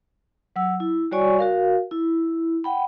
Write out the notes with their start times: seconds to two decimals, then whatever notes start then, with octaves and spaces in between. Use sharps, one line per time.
0.56 F#3 F#5 E6
0.80 E4
1.11 G3 F#4 C#5 D5 G#5 C#6
1.39 F#4 A#4 F5
1.91 E4
2.64 F#5 G5 B5